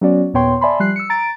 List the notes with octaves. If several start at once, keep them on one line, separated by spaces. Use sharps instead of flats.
F#3 B3 C#4 F#4 D5
D#2 A#2 B3 C#5 G5 C6
D5 E5 G#5 A5 B5 C6
F3 G3 F#6 C7
E6 C#7
A#5 A6 D7